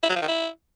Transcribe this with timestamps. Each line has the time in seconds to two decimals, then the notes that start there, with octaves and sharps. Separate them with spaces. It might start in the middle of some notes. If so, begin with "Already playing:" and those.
0.03 E4
0.09 F#3
0.16 F3
0.22 D#3
0.28 E4